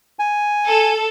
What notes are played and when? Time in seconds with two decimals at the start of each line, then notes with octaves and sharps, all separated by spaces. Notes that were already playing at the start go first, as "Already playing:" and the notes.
0.19 G#5
0.68 A4